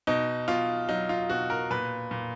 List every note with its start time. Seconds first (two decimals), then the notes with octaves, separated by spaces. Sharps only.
0.07 B2 D#4
0.48 B2 F4
0.88 F#3 D#4
1.09 F4
1.29 B2 F#4
1.50 A#4
1.70 A#2 B4
2.11 A#2